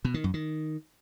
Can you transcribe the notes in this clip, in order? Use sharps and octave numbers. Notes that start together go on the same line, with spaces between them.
B2
D#3
F#2
D#3